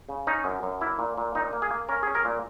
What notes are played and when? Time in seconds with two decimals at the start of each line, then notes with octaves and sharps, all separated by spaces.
0.09 C#3
0.27 C#4 D#4
0.45 F#2
0.63 F#2
0.81 A#3 E4
0.99 A#2
1.17 A#2
1.35 A#2 D#4
1.53 A#3
1.62 G#4
1.71 A#3
1.89 C#4 A#4
2.03 C#4 G#4
2.15 A#4
2.25 A#2